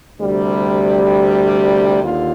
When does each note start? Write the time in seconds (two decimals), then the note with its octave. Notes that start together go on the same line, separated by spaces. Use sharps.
0.20 D2 C3 G3
2.03 D#2 D3 F4